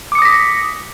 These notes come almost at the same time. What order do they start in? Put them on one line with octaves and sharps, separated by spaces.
D6 C#7 D#6 A#6 B6